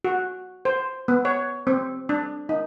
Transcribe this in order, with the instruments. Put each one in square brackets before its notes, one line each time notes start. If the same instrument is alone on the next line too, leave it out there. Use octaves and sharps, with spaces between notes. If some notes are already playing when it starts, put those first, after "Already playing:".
[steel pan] F#4
C5
B3
C#5
C4
D4
D#4